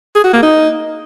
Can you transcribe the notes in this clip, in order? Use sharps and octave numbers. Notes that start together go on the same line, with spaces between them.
G#4
F#4
A#3
D#4